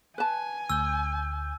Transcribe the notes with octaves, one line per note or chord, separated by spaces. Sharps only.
B4 G#5 A5
D2 E6 G6